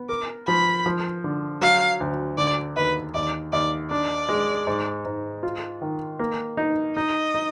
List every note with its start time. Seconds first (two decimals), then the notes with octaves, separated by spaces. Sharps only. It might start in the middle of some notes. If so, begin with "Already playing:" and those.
Already playing: B3
0.09 A#4 D6
0.47 F3 B5
0.86 F3
1.24 D3
1.61 F#3 F5
2.00 D2
2.38 D3 D5
2.76 D#2 B4
3.14 D#2 D5
3.53 D#2 D5
3.91 D4 D5
4.29 G#3
4.67 G#2
5.05 G#2
5.43 F4
5.82 D#3
6.19 A#3
6.57 D#4
6.96 D#4 D#5
7.34 D#4